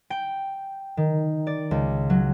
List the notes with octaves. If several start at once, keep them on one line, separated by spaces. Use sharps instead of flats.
G5
D#3
D5
C#2
F#3